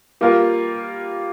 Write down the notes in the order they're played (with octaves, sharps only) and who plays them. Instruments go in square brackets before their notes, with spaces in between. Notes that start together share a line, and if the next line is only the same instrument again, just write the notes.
[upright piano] G3 A#3 F4 A#4